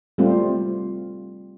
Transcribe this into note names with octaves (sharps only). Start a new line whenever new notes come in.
G3 A3 C4 F4